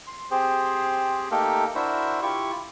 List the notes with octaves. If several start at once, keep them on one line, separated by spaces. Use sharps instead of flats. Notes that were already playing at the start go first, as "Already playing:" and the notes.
C6
C4 G4 G#4 C5
A3 A#3 D#4 G4 A4 A#4
D4 E4 F#4 A#4 C5 E5
E4 F4 G4 C#6